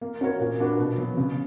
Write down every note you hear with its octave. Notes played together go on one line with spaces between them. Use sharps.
A#3
C#4 F#4 A#4 C#5
A#2
A#3 D4 F#4 B4
B2
F#3 B3
C#3